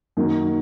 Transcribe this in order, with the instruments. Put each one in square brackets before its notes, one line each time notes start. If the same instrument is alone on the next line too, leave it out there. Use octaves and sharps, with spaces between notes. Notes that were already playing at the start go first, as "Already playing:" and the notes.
[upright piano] F#2 D#3 F#3 A#3